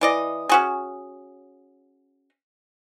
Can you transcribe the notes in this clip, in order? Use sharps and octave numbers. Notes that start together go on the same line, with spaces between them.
E3 D5 D#5
C#4 F#4 G#4